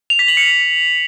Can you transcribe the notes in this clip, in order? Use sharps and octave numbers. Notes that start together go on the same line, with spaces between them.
F7
B6
F#7
C#7